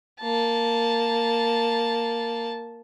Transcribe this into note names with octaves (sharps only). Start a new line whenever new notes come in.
A#3 A5